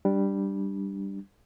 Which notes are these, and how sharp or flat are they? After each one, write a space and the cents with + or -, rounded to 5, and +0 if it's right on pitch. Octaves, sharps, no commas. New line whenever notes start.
G3 +0 D4 +0